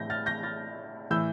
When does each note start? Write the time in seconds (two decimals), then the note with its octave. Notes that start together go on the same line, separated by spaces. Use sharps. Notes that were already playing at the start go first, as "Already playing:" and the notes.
Already playing: A2 E3 G6 A#6
0.10 F6 A6
0.26 G6 A#6
0.43 F6 A6
1.10 A2 E3 E6 G6